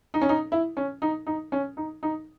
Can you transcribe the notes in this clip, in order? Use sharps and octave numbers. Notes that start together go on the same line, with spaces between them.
D#4
C#4
D#4
E4
C#4
D#4
D#4
C#4
D#4
D#4